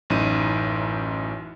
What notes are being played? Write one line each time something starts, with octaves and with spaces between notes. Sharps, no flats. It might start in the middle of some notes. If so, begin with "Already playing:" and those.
A1 F#2 D#4 E4 D#7